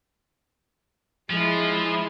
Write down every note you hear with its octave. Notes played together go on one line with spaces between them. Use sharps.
F3 G#3 E4